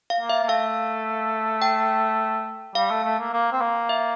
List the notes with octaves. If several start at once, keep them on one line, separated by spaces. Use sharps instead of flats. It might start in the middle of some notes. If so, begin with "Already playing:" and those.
F5
A#3
E5
A#3
A3 F5
G5
G3 F5
A3
A3
A#3
A#3
C4
A#3
E5